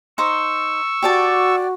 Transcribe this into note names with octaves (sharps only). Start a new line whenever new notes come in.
D#4 C5 C#6 E6
F#4 G4 D5 A5